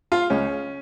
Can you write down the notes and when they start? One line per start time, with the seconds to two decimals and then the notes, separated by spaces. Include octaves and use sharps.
0.12 F4
0.30 C#2 C#4